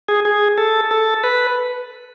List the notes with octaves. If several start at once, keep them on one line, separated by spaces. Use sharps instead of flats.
G#4
G#4
A4
A4
B4